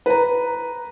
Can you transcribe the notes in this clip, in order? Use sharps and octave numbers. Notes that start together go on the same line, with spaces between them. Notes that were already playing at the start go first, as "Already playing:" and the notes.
B4 A#5